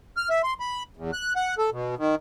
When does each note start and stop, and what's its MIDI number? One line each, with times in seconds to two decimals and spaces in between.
0.17 0.29 89
0.30 0.42 76
0.43 0.54 84
0.60 0.83 83
0.97 1.11 40
1.13 1.33 90
1.36 1.55 78
1.58 1.70 69
1.72 1.95 47
1.98 2.15 51